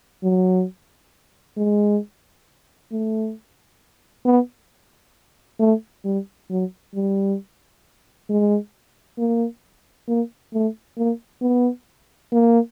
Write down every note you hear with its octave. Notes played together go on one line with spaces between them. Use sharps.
F#3
G#3
A3
B3
A3
G3
F#3
G3
G#3
A#3
A#3
A3
A#3
B3
A#3